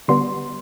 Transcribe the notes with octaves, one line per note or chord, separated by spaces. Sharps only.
D3 G3 B3 C6